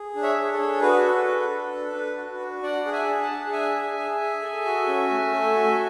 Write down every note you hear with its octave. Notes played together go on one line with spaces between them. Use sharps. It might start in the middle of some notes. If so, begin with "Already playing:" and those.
Already playing: G#4
D4
C#5 E5
G#4
A4 C#5
D4
F#4 B4
A4
D4
A4
D4
D4
F#4
D4
D4 D5 F#5
G#4
E5 G#5
D4
F#5 A5
G#4
D4 E5 G#5
G#4
G#4
G#4
A4
F#4
C#4
A3
A4
F#4